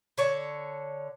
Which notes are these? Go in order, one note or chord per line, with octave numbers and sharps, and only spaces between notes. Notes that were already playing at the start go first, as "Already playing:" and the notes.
D3 C#5 A5